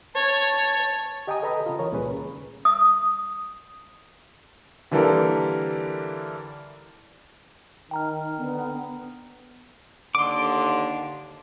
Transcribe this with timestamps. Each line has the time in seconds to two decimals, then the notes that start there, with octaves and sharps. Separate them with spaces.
0.15 C#5 A5
1.27 G4 D#5 G5 G#5 A#5 D#6
1.43 A4 B4 D#5 A#5 B5
1.66 C#3 F4
1.79 E3 A#4 C#5
1.92 C#2 A#2 G3 C#4 G#4 B4
2.13 D#2
2.65 D#6
4.91 D3 E3 G3 A#3 A4 A#4
7.91 D#3 G5 A#5 F6
8.39 D3 B3
10.15 D#2 D3 C6 D6